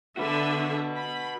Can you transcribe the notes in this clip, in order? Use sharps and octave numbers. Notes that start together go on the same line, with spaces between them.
D3 D4 F#4 B4 E5
B5